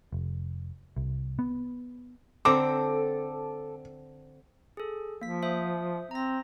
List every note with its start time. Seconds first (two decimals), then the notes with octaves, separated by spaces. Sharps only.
0.12 F1
0.97 C2
1.39 B3
2.45 D3 C4 A4 A#5 D6
4.77 G#4 A4
5.22 F3 A#3 B6
5.42 C5 E5 D#6
6.11 C4 A#5 A#6